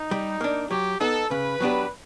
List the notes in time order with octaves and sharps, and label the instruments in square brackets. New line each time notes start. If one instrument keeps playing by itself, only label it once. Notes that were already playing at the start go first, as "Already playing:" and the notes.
Already playing: [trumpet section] D#4
[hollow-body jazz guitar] G3
A#3 D4
[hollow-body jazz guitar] F#3 [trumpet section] G4
[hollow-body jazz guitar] B3 D#4 [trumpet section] A4
[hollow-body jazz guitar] C#3 [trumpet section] B4
[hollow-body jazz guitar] F#3 B3 D4 G4